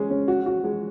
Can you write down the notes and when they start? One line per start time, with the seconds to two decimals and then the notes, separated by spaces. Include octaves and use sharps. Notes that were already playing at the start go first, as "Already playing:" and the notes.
Already playing: G#3 C#4 G#4
0.10 C#4
0.28 F#4
0.46 F#4
0.64 G#3